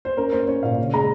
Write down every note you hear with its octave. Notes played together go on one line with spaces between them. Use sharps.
C5
C#4 A#4
C#4 C5
C#4 C#5
A#2 F5
C#3
G#3 A#5